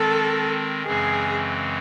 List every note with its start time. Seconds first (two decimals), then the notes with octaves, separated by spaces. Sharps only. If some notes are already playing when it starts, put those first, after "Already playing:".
Already playing: D#3 G#3 C4 A4
0.86 F#2 C#3 E3 G#3 C4 G#4